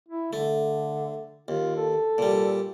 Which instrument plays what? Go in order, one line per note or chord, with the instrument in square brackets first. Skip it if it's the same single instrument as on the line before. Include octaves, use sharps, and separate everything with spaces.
[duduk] E4
[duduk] D3 [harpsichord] A3
[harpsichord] D#2 [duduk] F4
[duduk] A4
[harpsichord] A#2 G3